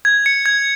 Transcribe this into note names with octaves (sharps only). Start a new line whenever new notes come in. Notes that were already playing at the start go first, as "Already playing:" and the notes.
G#6
C#7
G#6